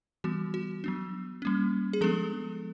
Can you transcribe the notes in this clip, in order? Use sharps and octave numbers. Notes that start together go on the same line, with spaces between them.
E3 G3 B3 F#4
F#4
F#3 B3 D4
G3 A#3 C#4
G#4
F3 G#3 B3 D4 A4